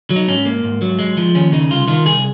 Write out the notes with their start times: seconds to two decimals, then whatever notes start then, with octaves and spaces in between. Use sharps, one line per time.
0.10 F#3
0.16 D#4
0.28 G#2 C#4
0.45 A#3
0.64 G#2
0.82 F#3
0.99 G#3
1.17 F3
1.35 D#2 C#4
1.52 C#3 D#4
1.71 C2 F4
1.88 D#3 F4
2.05 C2 G#4